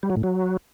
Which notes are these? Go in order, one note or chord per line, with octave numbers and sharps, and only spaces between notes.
G3
F#3
A2
F#3